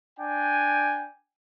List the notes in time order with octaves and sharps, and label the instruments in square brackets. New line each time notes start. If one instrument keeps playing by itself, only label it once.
[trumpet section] D4 G5 G#5